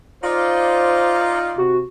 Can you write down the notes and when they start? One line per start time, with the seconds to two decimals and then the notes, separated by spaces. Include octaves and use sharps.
0.24 D#4 F4 C5 D5
1.58 C3 F#4